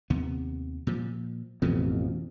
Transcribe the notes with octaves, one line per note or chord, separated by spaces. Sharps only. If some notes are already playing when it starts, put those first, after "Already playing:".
D#2 C3 B3
A#2 F3
A1 F2 B2 E3 B3